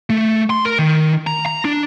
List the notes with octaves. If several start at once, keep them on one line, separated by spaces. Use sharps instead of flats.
A3
C6
A#4
D#3
A#5
A#5
D4